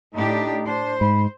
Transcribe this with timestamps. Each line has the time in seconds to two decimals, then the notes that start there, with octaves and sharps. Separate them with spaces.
0.15 A2 D4 D#4 G4
0.67 D4 C5
1.01 G#2 B5